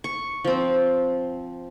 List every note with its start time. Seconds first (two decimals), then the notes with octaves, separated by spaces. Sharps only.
0.04 C#6
0.44 F3 C4